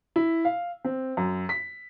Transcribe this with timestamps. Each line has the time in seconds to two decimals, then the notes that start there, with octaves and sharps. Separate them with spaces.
0.16 E4
0.45 F5
0.85 C4
1.17 F#2
1.49 B6